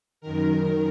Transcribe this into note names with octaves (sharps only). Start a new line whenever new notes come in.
F#2 D#3 A#4